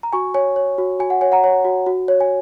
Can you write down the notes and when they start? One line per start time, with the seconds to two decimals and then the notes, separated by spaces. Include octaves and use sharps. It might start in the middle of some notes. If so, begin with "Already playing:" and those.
0.03 A#5
0.13 F#4 G#5 C#6
0.34 C#5 G#5
0.56 C#5
0.78 F#4
0.99 F#4 G#5
1.10 F#5
1.21 C#5 G#5
1.32 F#5 A#5
1.44 C#5
1.65 F#4
1.86 F#4
2.08 C#5
2.20 G#5